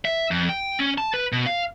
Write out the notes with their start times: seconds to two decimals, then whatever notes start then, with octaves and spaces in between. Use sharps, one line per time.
0.05 E5
0.31 F2
0.49 G5
0.79 C#4
0.98 A5
1.14 B4
1.32 B2
1.46 F5